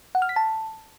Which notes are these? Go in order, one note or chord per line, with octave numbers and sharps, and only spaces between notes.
F#5
F6
B6
A5